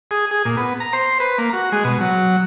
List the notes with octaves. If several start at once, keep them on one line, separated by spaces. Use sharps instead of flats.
G#4
G#4
A#2
B3
A#5
C5
B4
A#3
F#4
G#3
B2
F#3